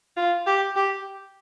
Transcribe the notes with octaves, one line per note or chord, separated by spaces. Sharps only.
F4
G4
G4